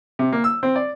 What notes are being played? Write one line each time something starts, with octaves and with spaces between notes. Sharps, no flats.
C3
A#3
E6
C4
D5